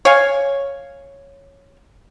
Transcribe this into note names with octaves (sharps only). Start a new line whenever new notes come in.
C#5 F5 G#5